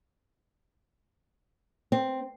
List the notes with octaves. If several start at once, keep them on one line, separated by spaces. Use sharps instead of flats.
C4